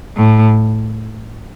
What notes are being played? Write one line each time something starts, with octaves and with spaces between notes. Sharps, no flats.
A2